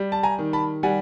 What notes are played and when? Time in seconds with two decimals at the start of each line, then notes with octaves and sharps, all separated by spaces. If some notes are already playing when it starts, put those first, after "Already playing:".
Already playing: G3
0.12 A5
0.23 G#5 A#5
0.38 D#3
0.53 A5 B5
0.83 G3 F#5 G#5